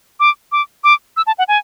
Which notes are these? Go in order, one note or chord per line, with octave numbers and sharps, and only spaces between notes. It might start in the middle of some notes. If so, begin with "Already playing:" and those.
D6
D6
D6
E6
A5
F#5
G#5